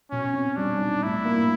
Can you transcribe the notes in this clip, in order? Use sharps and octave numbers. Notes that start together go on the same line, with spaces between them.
B2 C#4
C4
G3 D4
D#4
A2 E4
A#3